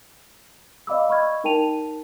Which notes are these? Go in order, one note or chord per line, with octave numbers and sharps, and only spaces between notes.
D5 D#5 F5 B5 D6 E6
D#5 B5 C#6 F6 G#6
D#4 A#4 G5 A5 D#7 F7